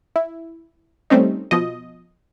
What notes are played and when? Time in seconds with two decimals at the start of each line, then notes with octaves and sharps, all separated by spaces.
0.16 E4
1.10 G3 A3 C4 C#4 D#4
1.51 B2 F3 D#5